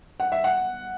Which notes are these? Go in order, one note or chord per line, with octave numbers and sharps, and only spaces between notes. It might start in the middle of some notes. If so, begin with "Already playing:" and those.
F#5
E5
F#5